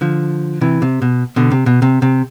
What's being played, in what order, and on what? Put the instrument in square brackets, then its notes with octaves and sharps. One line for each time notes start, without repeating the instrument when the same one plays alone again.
[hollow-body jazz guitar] D3 F3
C3 E3
C3
B2
B2 D3
C3
B2
C3
C3